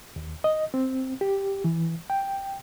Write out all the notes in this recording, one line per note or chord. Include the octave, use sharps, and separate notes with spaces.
D#2
D#5
C4
G4
E3
G5